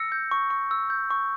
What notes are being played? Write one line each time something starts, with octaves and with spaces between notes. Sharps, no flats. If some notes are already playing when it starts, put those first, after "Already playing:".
Already playing: E6 A#6 C#7
G6
C#6
C#6
E6
G6
C#6